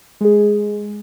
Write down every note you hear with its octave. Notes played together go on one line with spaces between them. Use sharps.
G#3 G#4